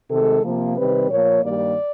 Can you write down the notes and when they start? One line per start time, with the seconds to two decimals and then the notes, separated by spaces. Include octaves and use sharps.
0.11 C3 D#3 G#3 A4
0.43 C3 F3 A#3
0.77 C3 D#3 G3 C4 B4
1.09 A#2 F3 A#3 C#5
1.42 G2 D#3 G3 A#3 D5